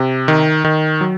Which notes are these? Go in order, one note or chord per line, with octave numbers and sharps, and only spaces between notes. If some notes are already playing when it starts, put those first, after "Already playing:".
Already playing: C3
D#3
D#3
F#3